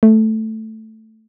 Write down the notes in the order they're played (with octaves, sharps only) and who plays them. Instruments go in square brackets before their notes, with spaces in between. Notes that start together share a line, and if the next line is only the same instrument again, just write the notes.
[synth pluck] A3